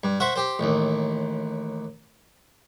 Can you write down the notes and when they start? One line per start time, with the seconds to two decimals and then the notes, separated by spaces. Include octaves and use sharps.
0.03 G2
0.20 C5 E5 F#5 C#6
0.36 G4 C5
0.59 A1 D#2